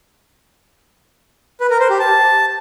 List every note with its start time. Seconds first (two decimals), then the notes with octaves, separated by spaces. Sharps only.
1.60 B4
1.70 A#4
1.80 C5
1.90 G4
1.99 A5